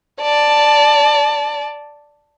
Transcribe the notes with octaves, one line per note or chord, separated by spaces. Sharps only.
D5 A5